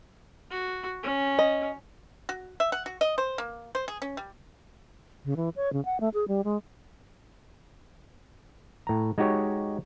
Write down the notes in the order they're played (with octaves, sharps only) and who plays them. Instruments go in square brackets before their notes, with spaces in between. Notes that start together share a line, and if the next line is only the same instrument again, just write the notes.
[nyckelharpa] F#4
C#4
[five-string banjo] D#5
[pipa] F#4
E5
F#5
F#4
D#5
C5
A#3
C5
G#4
C#4
G3
[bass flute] C#3
E3
C#5
C#3
F#5
A3
G#4
G3
G#3
[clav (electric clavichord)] A2 A#5
G#3 D#4 F#4 G4 C#5